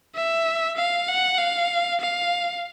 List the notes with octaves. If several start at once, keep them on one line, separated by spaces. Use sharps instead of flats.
E5
F5
F#5
F5
F5